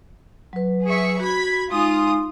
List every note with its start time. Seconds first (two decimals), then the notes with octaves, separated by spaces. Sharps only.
0.53 F#3 B4
0.84 G#4 E5 C#6
1.20 F#4 B5 G#6 B6
1.72 G#3 D#4 F4 G#5 D#6